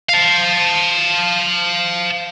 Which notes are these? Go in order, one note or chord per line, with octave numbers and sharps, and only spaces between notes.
F5 A5